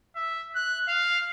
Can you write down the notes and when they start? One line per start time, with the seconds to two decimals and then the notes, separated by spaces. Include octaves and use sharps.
0.16 E5
0.55 F#6
0.88 F5